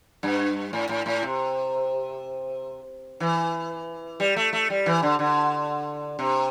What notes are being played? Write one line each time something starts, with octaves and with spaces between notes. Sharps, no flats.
G2
A2
A2
A2
C3
E3
G3
A3
A3
G3
E3
D3
D3
C3